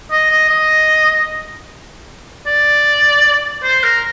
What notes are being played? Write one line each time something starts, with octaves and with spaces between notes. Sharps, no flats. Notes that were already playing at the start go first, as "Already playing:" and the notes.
D#5
D#5
D#5
D5
C5
A#4